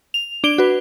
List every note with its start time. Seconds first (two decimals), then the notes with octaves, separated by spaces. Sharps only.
0.14 F7
0.44 D4 D7 G7
0.58 F#4 B4